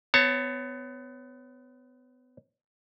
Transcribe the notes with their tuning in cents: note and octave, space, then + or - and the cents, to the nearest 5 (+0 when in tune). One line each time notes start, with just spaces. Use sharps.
B3 +30 C#5 +0 A5 +35